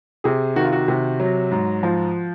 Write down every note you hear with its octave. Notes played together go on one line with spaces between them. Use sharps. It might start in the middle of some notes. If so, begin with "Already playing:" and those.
C3 G#4
D#3 F#4
F4
F#4
C3
F#3
G#2
F3